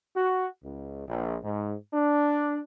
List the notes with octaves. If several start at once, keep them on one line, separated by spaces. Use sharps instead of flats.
F#4
C#2
A#1
G#2
D4